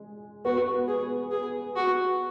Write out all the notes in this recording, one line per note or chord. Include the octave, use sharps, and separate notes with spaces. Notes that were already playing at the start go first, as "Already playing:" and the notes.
Already playing: G#3
B3 F#4
G#4
G#4
F#4